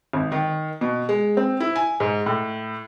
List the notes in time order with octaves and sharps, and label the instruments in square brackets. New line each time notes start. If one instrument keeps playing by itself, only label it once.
[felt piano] G#1
D#3
B2
G#3
C4
E4
G#5
G#2
A2